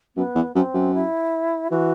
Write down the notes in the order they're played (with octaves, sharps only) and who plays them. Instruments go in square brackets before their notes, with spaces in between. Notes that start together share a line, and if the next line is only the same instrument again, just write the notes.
[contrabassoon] F#2 [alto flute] B3
[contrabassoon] E2
[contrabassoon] F#2 [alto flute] C4
[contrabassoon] F#2
[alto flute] E4
[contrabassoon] E3 [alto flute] F#4